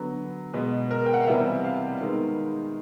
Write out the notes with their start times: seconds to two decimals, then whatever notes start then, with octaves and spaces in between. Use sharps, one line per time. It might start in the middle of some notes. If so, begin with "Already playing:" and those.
Already playing: D3 F#3 B3
0.53 B2 G#3 B3 B4
0.91 A#4
1.06 G5
1.14 F#5
1.21 F5
1.27 C3 E3 G3 B3 E5
1.64 F5
2.00 D#3 G#3 B3